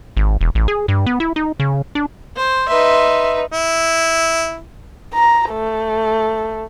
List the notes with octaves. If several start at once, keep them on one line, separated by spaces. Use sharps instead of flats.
G#1
E1
A1
G#4
G2
B3
E4
D#4
C#3
D4
C5
D#4 B4 E5 C6
E4
A#5
A3